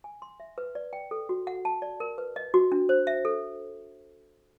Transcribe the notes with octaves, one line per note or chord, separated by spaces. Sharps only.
G#5
C6
E5
B4
D5
G5
A4
F#4
F#5
A5
D5
A#4
B4
D#5
F#4
D4
C5
E5
A4